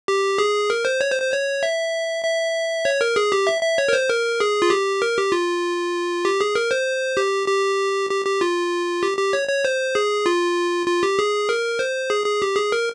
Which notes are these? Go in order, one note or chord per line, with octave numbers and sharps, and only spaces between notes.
G4
G#4
A#4
C5
C#5
C5
C5
C#5
E5
E5
C#5
A#4
G#4
G4
E5
E5
C#5
A#4
C5
A#4
G#4
F4
G4
A#4
G4
F4
G4
G#4
A#4
C5
G4
G4
G4
G4
F4
G4
G4
C#5
C#5
C5
G#4
F4
F4
G4
G#4
A#4
C5
G#4
G#4
G4
G#4
A#4